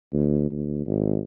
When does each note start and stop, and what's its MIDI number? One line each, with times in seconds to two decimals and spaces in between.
0.13 0.49 38
0.51 0.81 38
0.86 1.19 32